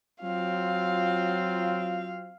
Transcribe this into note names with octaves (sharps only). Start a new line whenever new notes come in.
F#3 C4 F4 F5